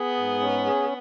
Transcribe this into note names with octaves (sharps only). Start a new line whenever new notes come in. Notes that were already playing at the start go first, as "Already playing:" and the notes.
Already playing: B3 G#4
G#2
C#4
G#4